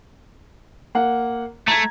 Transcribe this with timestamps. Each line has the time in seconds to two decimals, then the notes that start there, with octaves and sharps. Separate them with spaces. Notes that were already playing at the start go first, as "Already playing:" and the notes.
0.95 A#3 F#5
1.68 A3 A#5 G#6